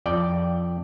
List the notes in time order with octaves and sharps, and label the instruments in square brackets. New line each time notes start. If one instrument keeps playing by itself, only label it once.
[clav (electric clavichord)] F2 D5 G5